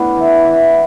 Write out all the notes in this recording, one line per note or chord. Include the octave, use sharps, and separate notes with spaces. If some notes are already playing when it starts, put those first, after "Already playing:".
Already playing: A2 B3 D4
E3
E3